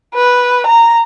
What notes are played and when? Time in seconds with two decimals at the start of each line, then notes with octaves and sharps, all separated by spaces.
0.14 B4
0.67 A#5